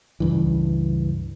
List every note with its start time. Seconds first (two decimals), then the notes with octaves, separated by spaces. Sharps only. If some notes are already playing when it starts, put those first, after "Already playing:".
0.20 C#2 G2 E3